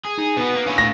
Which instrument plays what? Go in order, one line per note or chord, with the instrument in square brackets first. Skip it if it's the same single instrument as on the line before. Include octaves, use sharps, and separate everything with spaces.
[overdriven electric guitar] G#4
[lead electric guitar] D#4
[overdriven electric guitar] B2 B3 [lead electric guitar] B4
[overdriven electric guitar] A#3
[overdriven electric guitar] C#4 E4 [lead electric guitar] D4 F5
[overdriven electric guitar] A2 [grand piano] A#6